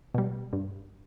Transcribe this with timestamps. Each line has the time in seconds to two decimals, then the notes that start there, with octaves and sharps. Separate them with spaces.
0.14 B2 G3
0.53 G2